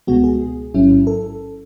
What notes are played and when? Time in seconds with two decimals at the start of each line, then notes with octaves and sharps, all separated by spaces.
0.07 C#2 B2 G#3 B3 F#4
0.24 G#4
0.74 A1 G#2 F#3 C#4 E4
1.07 A4